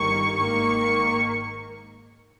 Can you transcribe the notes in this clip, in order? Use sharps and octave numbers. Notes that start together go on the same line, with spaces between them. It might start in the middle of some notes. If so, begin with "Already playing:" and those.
Already playing: G1 G2 D#3 A#3 C#6
G#2 D#3 A#3 C#6